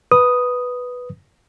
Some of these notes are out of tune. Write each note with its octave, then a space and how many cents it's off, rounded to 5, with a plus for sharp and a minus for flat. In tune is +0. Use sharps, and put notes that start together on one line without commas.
B4 +0 D#6 +0